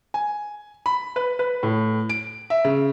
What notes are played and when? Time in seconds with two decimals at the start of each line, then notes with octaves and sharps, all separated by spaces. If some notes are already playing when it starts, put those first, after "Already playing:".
0.14 G#5
0.86 B5
1.16 B4
1.39 B4
1.63 A2
2.10 D7
2.50 E5
2.65 C#3